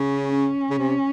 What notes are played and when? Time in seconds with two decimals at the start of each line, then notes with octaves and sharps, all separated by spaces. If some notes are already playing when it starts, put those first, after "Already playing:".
Already playing: C#3 C#4
0.32 C#4
0.70 C#3
0.78 C3